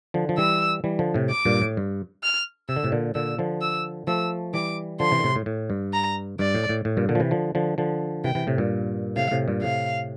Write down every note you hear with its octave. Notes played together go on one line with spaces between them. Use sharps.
D3 F3
F3
E3 G3 E6
E3 G3
D3 F3
A2 C3
D6
G2 A#2
A2
G2
F6
C3 E6
D3
A2 C3
A#2 D3
A#2 D3 E6
D3 F3
E6
F3 A3 E6
E3 G3 D6
D3 F3 C6
C3 E3
D3
A2 C3
A2
A2
G2
A#5
G2 D5
A2
A2
A2
G2 A#2
A#2 D3
F3
C3 E3
D3 F3
D3 F3
D3 F3
C3 E3 G5
C3 E3
A2 C3
G2 A#2
A2 C3 F5
A2 C3
G2 A#2
A2 C3 F5